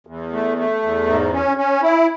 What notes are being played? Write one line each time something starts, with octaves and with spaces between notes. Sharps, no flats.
E2
A3
A3
E2
G#2
C#4
C#4
E4